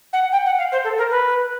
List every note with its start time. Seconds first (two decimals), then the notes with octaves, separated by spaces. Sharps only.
0.13 F#5
0.32 G5
0.46 F#5
0.58 F5
0.72 C5
0.84 A4
0.98 A#4
1.10 B4